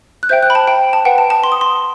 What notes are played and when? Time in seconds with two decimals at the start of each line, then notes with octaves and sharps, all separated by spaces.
0.23 F#6
0.29 C5 E5 G5 G6
0.43 F#6
0.50 B5
0.55 A5
0.67 G5
0.93 A5
1.05 B4 F#5 G5
1.18 A5
1.30 A5
1.44 C6
1.52 D#6
1.61 C6